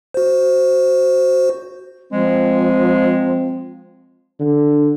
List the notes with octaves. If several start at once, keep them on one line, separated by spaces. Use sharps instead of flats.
F#4 C5
F3 G#3 C4
D3